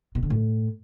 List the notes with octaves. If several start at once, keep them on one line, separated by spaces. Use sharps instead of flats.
B2
D3
A2